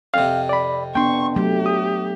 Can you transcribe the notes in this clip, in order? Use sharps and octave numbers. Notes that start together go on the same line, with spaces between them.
F2 C3 F5
D5 B5
B3 D4 G5 C6 C#6
F#3 A3 G4
D#6